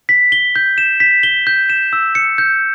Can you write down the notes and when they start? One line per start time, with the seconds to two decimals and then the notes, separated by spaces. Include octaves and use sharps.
0.09 B6
0.32 G7
0.56 G6
0.78 E7
1.00 B6
1.23 G7
1.47 G6
1.70 E7
1.93 E6
2.15 C#7
2.38 G6